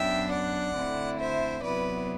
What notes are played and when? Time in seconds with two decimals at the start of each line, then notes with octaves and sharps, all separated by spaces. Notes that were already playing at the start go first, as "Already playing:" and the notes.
Already playing: F#2 F#3 B3 D4 E5 G5
0.31 D5 F#5
0.75 D3 A3 C4 E4
1.20 C5 E5
1.64 C3 F#3 B3 E4 B4 D5